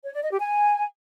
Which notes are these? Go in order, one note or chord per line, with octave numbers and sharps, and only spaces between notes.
C#5
D5
D#5
G4
G#5